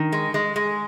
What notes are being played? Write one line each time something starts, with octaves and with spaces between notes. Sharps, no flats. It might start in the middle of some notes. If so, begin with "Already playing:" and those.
Already playing: D#3
G#3
G#3
G#3